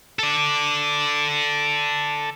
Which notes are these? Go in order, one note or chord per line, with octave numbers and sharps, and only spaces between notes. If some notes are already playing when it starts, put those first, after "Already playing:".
A4 D5